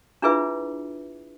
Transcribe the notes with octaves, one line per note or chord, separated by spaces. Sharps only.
D4 E4 F4 G#4 B4 E5